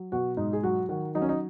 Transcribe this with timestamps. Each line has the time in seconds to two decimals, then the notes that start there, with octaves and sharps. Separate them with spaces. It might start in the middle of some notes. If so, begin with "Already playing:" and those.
Already playing: F#3
0.12 B2 F#4
0.37 G#2 D#4
0.53 G#4
0.63 F#3 F#4
0.89 D#3 F#4
1.15 F#3 D#4
1.22 C#4
1.29 D#4